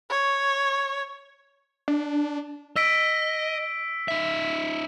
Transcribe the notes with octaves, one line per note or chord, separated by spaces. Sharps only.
C#5
D4
D#5 E6 B6 D7
D#4 E5